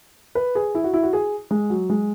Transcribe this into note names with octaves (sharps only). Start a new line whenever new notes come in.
B4
G#4
E4
F#4
E4
F#4
G#4
G#3
F#3
G#3